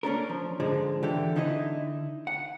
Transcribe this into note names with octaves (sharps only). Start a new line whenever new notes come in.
A#3 C#4 D4 A#4
F3
G#2 D3 F3 G#3
D3 E3 G4
D3 D#4 E4 C5 D#5
F#5